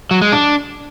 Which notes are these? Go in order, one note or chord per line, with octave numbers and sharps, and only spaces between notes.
F#3
G#3
D4